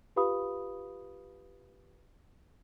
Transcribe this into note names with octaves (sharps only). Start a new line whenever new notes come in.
F4 G4 B4 F5 B5 D#6